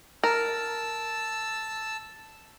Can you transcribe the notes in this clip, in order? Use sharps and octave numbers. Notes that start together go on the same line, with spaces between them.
A#4 A5 E6